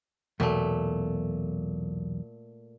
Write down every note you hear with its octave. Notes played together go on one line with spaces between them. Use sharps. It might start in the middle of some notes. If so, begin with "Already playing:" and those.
B1 E2 A#2 A3